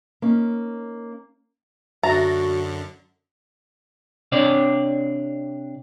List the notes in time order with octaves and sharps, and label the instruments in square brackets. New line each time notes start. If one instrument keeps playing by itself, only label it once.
[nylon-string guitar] A#3 C#4 D#4
[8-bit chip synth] F#2 D3 [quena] F#4 [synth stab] E5 A6 A#6 [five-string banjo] A#5
[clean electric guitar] C3 D4 C#5 D5